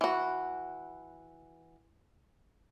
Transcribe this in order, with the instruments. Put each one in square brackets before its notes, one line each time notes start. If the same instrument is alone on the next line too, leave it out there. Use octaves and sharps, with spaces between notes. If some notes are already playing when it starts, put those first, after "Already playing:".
[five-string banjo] E3 F#4